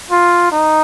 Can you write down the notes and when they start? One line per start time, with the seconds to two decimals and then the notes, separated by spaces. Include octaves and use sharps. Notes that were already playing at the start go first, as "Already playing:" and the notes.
0.11 F4
0.52 D#4